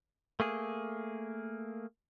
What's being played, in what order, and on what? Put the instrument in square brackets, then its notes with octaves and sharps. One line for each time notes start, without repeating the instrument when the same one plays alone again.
[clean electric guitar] A3 A#3 G#4